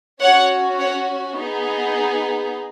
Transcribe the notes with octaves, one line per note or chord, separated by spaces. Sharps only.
C#4 F#4 C#5 F#5
C#5 F#5
B3 D#4 G#4